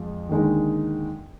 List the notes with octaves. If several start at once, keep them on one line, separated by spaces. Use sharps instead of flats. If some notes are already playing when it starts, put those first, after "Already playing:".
Already playing: F2 F3 G#3
D#2 D3 G#3 D#4